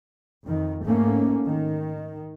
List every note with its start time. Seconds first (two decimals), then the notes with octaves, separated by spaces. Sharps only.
0.46 F2 D#3
0.84 G#2 A3 A#3 C#4
1.45 D#3